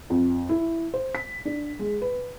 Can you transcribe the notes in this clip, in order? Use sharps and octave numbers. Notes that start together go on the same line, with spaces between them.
F2
E4
C5
B6
D4
G#3
B4